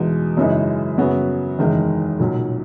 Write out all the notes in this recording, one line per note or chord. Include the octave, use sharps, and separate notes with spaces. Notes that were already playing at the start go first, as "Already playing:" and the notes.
Already playing: E2 B2 G#3 D#4
F#2 C#3 E3 G#3 D#4
F#2 C#3 F#3 B3 F#4
F#1 E2 D#3 G#3
B1 A#2 F#3